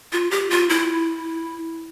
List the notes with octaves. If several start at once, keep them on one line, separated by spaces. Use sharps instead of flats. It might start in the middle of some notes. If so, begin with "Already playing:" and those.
F4
G4
F4
E4